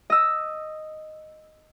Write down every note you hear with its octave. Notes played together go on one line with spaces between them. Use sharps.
D#5 E6